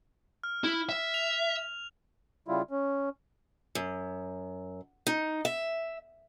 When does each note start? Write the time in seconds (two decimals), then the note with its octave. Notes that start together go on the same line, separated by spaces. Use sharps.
0.44 F6
0.64 E4
0.89 E5
1.14 F7
2.48 C#3 G3 E4 F4
2.71 C#4
3.75 F#2
5.07 D#4
5.45 E5